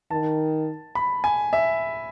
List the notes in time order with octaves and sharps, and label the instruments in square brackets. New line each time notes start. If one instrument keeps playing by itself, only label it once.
[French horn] D#3 [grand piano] A5
[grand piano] B5
G#5
E5